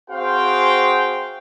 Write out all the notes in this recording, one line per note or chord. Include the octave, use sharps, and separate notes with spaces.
C4 F#4 G#4 C5 F5 G5